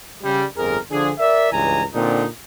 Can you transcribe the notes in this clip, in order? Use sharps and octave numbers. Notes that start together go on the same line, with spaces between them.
C#3 G3
G1 F2 G#4 A#4
D3 F3 D4 G#4
A#4 D5 E5
C#2 G2 E3 G#5 A#5
A#2 D3 C4 D4 D#4